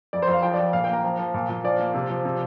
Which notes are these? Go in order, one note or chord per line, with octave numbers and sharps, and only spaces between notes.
F2 D5
C5
F2
F5
F3 G5
D5
F3
A#2 F5
A#3 G5
A#5
F3
F3
A#2
A#2
F3 D5
A#3
C3
F3
C3